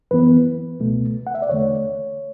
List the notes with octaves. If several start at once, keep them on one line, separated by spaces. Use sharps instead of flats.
F#2 E3 B3 B4
C#2 B2 A3
F#5
E5
D5
E2 D3 A3 C#5